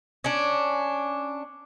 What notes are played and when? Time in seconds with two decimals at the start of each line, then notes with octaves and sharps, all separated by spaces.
0.24 C#4 D4